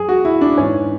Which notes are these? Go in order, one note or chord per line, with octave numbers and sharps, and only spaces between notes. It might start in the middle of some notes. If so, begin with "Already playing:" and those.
Already playing: F#2 G#4
F#4
E4
D4
G#2 E3 C#4